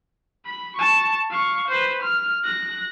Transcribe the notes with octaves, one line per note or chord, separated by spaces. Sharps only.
B5
A5 C#6
F5 C#6
B4 C5
F6
F#6 A#6